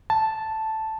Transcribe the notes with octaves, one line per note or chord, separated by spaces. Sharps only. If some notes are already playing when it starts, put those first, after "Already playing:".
A5